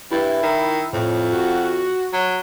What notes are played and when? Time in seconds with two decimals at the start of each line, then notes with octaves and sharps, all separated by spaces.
0.11 G2 E4
0.42 D#3
0.93 F2 A2
1.33 F#4
2.13 F#3